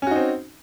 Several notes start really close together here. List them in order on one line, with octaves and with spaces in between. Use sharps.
C#4 F#4 D#4 C4